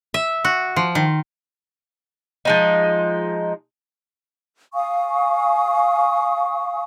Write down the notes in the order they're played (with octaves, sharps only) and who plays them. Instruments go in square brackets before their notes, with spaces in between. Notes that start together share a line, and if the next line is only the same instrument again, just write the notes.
[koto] E5
F#4
F3
D#3
[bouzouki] F3 G#3 D#4
[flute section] F5 G#5 C#6 D#6